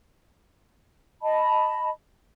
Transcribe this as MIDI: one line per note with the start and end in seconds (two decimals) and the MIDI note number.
1.22 1.90 75
1.22 1.90 81
1.22 1.90 83